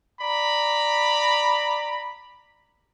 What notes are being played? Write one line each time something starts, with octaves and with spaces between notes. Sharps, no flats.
D5 A#5 B5